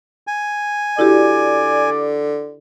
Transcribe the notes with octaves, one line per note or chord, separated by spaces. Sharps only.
G#5
D3 E4 F#4 G4 D5